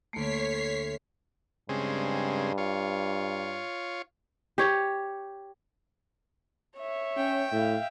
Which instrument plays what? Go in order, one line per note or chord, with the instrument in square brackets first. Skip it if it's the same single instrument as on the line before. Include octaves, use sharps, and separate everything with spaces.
[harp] D2 D7 [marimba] A3 A#3 [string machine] C#5 B6 C7
[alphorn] G2 [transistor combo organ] C#3 G#3 C4
[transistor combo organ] F4 C#5
[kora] G4 C#5
[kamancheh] C#5 E5
[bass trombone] C#4 [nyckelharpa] G5
[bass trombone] A2 [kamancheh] E5 F5